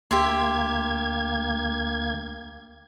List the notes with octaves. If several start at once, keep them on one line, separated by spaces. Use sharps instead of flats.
D2 A#3 G4 E5 C6 G#6